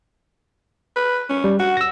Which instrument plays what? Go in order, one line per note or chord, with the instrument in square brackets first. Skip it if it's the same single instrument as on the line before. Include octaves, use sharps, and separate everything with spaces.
[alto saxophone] B4
C#4
[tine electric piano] G3
[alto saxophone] F#4 [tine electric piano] F#5
[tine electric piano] E6 A#6